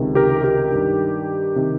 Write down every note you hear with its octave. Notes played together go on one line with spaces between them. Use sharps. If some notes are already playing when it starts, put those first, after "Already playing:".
Already playing: C#2 C3 D#3
G4 A#4
G4
G2 D#3
C3 D#3